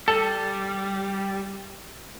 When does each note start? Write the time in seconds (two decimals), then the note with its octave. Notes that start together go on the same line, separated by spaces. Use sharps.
0.08 G3 A4